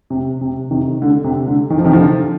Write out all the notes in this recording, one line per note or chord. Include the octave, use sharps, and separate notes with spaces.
C3
C3
C3 D#3
D3
C3
D3
D#3
F3
C3 D#3
D3 F3